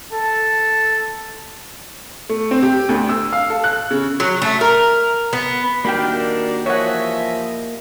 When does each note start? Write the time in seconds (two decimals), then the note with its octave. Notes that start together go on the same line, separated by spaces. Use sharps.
0.13 A4
2.29 A3
2.51 C4
2.63 G4
2.89 D2
3.09 E6
3.32 F5
3.50 A4
3.64 F#6
3.91 C#3
4.20 F#3
4.42 A3
4.61 A#4
5.33 B3
5.85 D#3 A#3 D4 F#4 G4 G5 B5 F6
6.66 E3 F3 C#5 D#5 E5 F#5